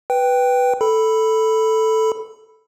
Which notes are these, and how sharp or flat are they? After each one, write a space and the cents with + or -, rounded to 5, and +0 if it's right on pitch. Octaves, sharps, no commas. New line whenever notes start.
B4 +0 G5 +0
A4 +0 B5 +0